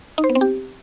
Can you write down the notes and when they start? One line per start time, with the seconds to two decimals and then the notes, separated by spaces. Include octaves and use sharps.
0.18 D#4
0.24 C5
0.30 B3
0.35 C4
0.41 G4